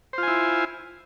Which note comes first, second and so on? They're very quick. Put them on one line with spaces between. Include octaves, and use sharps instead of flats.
C5 F4 G#5 E4